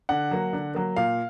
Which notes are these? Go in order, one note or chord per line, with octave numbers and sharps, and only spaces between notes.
D3 F#5
F#3 A#3
D3
F#3 A#3
A#2 F5